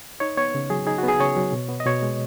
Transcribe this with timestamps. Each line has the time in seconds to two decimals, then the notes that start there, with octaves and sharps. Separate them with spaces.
0.20 D#4 C#5
0.37 B3 C#5
0.54 C#3
0.70 F#3 G#4
0.87 D#4 G#4
0.98 F#4
1.04 B3 G#4
1.19 C#3 C#5
1.37 F#3
1.53 B2
1.69 B3
1.80 D#5
1.86 B2 C#5
2.02 G#3